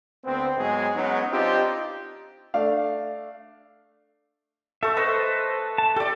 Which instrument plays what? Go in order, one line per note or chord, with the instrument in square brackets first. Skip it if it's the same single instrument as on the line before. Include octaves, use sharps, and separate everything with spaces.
[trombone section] D2 B3 C4
G#2 F#3 G#3 B3 G#4
F#3 G#3 B3 C#4 D#4
C4 D4 D#4 F4 G4
[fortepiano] A3 D4 F5
[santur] A3 A4 [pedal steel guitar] E5
[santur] B4 D#5 [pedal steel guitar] C5 E5
[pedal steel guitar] A5
[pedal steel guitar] G4 E5 [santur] A4 D5